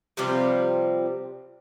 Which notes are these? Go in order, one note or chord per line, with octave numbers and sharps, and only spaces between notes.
C3 F3 G3 C4